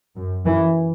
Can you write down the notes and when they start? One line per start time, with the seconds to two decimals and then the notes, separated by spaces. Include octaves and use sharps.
0.16 F#2
0.46 F#2 E3